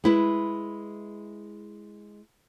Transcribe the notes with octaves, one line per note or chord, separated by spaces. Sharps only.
G#3 E4 B4